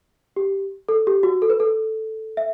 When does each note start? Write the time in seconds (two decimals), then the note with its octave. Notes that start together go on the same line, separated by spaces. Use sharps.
0.36 G4
0.89 A4
1.07 G4
1.23 F#4
1.42 A4
1.50 B4
1.60 A4
2.37 E5